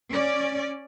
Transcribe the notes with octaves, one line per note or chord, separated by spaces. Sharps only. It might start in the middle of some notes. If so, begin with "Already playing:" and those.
C#4 D5